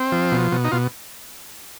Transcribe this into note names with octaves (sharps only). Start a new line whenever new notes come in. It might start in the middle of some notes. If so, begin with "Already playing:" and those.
Already playing: C4
F3
B2
B2
D#4
B2 F4